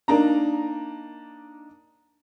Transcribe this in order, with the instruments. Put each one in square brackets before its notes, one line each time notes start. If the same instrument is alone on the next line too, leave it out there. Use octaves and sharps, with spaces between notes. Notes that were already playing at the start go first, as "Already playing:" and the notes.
[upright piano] A#3 D4 D#4 A#5